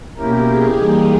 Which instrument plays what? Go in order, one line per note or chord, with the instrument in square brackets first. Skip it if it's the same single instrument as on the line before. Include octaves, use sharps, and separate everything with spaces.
[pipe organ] B2 A#3 C#4 E4 A#4 [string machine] G4
[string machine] G#4
[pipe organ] E3 G3 A#3 D#4